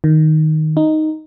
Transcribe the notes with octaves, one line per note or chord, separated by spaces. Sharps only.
D#3
D#4